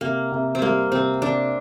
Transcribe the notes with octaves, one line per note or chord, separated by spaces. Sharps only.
C3 A#3
C3
C4
G3 A#3
C3 C4
C3 D4